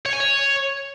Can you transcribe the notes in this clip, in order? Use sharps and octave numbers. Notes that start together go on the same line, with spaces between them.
C#5
G#5
C#5